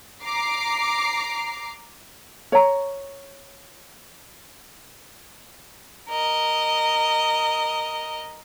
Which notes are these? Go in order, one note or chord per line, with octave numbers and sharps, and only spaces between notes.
A#5 D6 C7
C#5 A#5
A#4 D#5